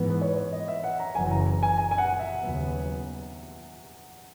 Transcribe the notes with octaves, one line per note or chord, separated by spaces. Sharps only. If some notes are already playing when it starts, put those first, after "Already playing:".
Already playing: G#2 E3 B3
B4
C#5
D#5
E5
F#5
A#5
F#1 F#2 C#3 E3 G#5
A#5
A#5
G#5
G#5
G#5
F#5
E5
D#2 C#3 F#3 B3